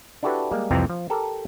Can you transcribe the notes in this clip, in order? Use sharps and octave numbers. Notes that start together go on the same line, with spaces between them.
D4 E4 F#4 G4 A4 B4
G3 G#3 A#3
C2 F2 C3 E3 C4 A#5
F3
G4 A4 A#4